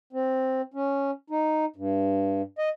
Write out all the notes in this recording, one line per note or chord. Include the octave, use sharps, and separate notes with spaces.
C4
C#4
D#4
G2
D#5